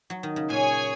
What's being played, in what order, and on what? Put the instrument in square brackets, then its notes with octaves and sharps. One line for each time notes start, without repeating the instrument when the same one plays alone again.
[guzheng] F#3
D#3
C#3
[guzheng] A#2 [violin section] G#4 C#5 G#5